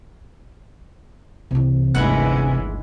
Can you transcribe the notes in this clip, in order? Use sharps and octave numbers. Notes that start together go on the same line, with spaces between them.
C2 C3 E3
G1 D2 D#3 E3 G#3 C#4 B4 F#5